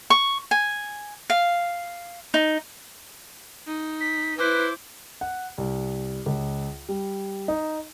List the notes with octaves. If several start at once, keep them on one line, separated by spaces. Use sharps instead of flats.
C#6
G#5
F5
D#4
D#4
B6
E4 B4 C5 D6
F#5
C2
C#2
G3
D#4